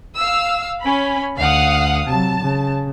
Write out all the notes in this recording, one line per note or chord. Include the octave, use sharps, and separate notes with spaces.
F5 E6
C#4 B5
D2 F5 F#5 D#6
C3 F#3 A5
C#3